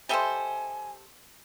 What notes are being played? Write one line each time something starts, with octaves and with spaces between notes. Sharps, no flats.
G3 G4 A4 C5 D#5 E5 G#5